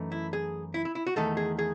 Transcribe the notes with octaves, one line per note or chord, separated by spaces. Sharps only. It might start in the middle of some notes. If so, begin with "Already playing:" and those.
Already playing: F#2 E3 A3 D#4
E4
G#4
E4
E4
E4
F#4
E2 D#3 A3 D#4 A4
G#4
G#4